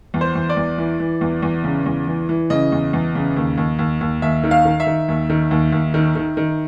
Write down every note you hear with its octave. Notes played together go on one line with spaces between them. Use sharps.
E2
C5
E2
D5
E2
E3
E3
E2
E2
C#3
E2
E3
E3
C#3 D#5
E2
E2
C#3
D#2
D#2
D#2
D#2
D#2 E5
D#3
F5
D#3
E5
D#3
D#2
D#3
D#2
D#2
D#3
D#3
D#3